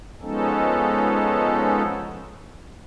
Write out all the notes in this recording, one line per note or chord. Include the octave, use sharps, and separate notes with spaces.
F3 G#3 B3 C#4 D#4 A4